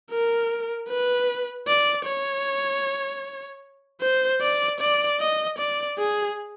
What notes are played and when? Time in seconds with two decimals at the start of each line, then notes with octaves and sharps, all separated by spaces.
0.11 A#4
0.88 B4
1.67 D5
2.06 C#5
4.01 C5
4.42 D5
4.81 D5
5.20 D#5
5.59 D5
5.98 G#4